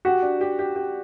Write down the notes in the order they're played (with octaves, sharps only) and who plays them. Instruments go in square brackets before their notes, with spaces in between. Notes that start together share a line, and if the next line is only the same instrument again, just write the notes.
[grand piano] F#4 [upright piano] G4
[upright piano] D4
G4
G4
G4